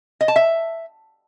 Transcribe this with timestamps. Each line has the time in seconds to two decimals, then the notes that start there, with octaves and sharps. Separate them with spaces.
0.21 D#5
0.28 A5
0.36 E5